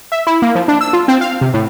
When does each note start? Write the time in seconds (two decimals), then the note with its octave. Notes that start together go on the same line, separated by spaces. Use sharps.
0.12 E5
0.27 E4
0.42 A#3
0.55 F3
0.68 D4
0.81 E6
0.93 F4
1.08 C4
1.21 F5
1.41 C3
1.54 A2